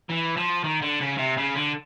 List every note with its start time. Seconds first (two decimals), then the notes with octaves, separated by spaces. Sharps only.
0.09 E3
0.37 F3
0.64 D#3
0.82 D3
1.01 C#3
1.18 C3
1.37 C#3
1.55 D3